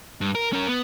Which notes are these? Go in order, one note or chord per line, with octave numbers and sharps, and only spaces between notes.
G2
A#4
C#4 A#4
B3